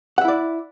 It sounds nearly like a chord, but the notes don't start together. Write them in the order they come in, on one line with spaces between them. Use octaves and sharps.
F#5 E5 E4 D5